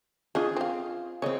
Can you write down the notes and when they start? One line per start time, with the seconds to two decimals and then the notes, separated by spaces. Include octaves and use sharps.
0.35 C#3 D4 F4 G#4 D#5
0.57 C4 F5
1.22 C#3 C4 C#5 D#5